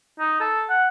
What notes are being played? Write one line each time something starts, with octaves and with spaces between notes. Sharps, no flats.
D#4
A4
F#5